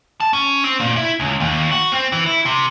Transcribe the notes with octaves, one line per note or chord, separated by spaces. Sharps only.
A5
C#4
C4
A#2
E4
C#2
D#2
F#4
C4
E3
E4
C3